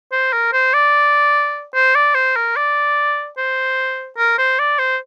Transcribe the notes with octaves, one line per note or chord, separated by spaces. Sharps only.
C5
A#4
C5
D5
C5
D5
C5
A#4
D5
C5
A#4
C5
D5
C5